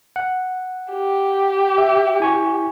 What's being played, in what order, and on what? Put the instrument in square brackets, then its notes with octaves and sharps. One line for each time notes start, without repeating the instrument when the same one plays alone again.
[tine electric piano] F#5
[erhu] G4
[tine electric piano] E5
E4 G#5 C#6